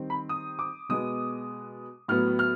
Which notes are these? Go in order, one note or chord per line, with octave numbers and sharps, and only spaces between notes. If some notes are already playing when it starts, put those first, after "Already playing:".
Already playing: D#3 G3 C4
B5
D#6
D6
B2 G#3 B3 D#6
A2 F#3 B3 F6
F6